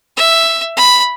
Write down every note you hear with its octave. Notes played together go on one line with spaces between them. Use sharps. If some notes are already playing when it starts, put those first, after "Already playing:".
E5
B5